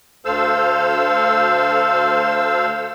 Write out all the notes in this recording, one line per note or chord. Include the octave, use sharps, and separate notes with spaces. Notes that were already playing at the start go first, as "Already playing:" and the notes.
D2 A4 C5 F5 E6